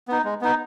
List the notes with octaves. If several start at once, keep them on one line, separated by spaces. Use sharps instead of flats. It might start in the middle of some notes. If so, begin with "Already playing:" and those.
B3 D#4
G#3
B3 D#4